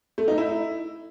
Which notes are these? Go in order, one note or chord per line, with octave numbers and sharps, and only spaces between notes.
A3
D#4
E4